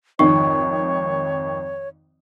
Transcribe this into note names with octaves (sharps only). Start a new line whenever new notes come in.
G#1 F2 D#3 D#4 C#5 C#6